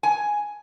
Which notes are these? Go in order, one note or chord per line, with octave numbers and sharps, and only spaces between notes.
G#5